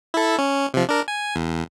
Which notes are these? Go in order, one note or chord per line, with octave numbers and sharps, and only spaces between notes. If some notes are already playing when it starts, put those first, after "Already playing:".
E4 A4
C#4
C3 F3
D4 A#4
G#5
E2